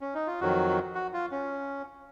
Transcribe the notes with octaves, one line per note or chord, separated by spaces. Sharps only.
C#4
D#4
F4
F2 D#3 F#3 F#4
F#4
F4
C#4